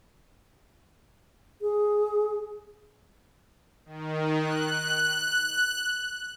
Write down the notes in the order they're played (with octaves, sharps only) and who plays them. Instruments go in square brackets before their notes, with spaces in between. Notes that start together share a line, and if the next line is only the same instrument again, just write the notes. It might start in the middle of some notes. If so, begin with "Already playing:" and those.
[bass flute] G#4
[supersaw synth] D#3
F#6